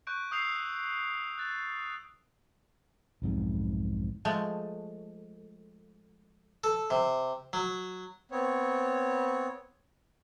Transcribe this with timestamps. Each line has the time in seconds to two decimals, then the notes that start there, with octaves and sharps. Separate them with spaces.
0.07 C#6 F#6 G6 D7
0.31 C#6 D#6 E6 G6 C7 F7
1.38 F#6 A6
3.22 B1 F2 G#2 C3
4.25 F3 G#3 A3
6.64 A4
6.90 C3
7.53 F#3
8.31 B3 C4 C#5